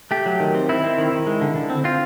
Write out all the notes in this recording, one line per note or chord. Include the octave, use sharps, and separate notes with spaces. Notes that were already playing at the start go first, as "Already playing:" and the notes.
A3 G4
F#3
D#3
C4
C4 E4
C4
D#3
D#3
G#3
D3
D3
C4
C4 F4